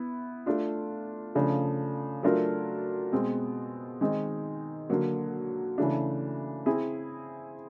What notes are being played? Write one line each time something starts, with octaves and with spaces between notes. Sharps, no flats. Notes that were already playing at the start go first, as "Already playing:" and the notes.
Already playing: B3 E4
A3 D4 F4
C#3 F3 A3 D4
F#3 A3 D4 F4 A#4
B2 G#3 C4
D#3 G#3 C4 D#4
D3 F#3 A#3
C#3 E3 A3 D4
C4 E4 G#4